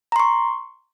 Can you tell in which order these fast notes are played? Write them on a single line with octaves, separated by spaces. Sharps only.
A#5 C6 C#6